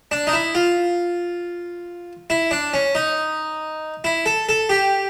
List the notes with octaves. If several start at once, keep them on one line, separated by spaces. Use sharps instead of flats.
D4
D#4
E4
F4
E4
D4
C#4
D#4
E4
A4
A4
G4